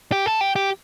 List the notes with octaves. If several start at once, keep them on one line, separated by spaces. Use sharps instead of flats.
G4
A4
G4
G4